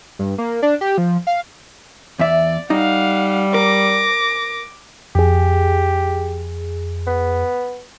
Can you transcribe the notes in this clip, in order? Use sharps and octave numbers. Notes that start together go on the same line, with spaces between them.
G2
A#3
D4
G4
F3
F5
E2 D5 E5
G3 D#4 F5 F#5
A#4 D6 A#6
F2 G4 G#4
B3